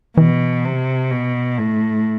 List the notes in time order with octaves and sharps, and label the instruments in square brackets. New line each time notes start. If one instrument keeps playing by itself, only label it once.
[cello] B2 [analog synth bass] E3
[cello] C3
B2
A2